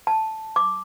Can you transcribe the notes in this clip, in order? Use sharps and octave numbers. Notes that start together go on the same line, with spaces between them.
A5
D6